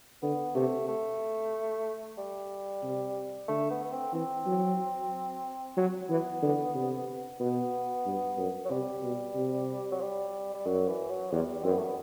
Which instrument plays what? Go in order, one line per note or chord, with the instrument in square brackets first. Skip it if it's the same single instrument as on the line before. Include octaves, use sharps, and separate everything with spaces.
[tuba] D3 [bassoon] B3
[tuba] C3 [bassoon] A3
[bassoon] A3
G3
[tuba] C3
[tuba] D3 [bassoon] A3
[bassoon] B3
B3
C4
[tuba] E3 [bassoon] C4
[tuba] F#3
F#3
[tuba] E3 [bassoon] B3
[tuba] D3
C3
[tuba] B2 [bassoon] B3
[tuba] G2
F#2
[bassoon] F#3
[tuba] C3 [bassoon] G3
[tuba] B2
C3
[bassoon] F#3
G3
G3
[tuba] F#2 [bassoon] F#3
[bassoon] E3
F#3
[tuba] E2 [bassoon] G3
[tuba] F#2 [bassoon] C4
[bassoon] B3
A3
B3